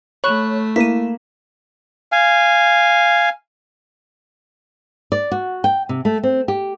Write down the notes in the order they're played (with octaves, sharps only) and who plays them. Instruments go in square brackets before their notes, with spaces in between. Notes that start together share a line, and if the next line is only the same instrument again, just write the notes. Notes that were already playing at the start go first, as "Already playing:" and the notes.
[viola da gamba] A3 [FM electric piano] C#5 [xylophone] B5 C#6 F#6
[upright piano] A#3 [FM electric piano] E4 [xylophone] B6 D#7
[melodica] F5 G#5
[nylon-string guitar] D5
F#4
G5
C3
A3
C4
G4